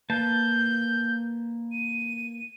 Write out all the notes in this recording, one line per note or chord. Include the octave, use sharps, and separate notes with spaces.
A#3 B4 A5 G6
D#7